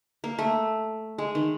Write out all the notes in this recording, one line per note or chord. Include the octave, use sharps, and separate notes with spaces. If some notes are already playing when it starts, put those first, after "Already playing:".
A#3
A3
G#3
D#3